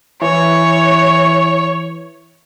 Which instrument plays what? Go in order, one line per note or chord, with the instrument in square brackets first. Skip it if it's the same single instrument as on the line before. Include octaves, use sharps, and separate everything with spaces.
[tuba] E3 [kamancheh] C#5